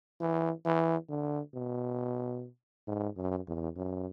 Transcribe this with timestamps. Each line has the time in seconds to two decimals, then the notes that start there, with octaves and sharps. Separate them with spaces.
0.21 E3
0.65 E3
1.09 D3
1.54 B2
2.87 G#2
3.17 F#2
3.48 E2
3.76 F#2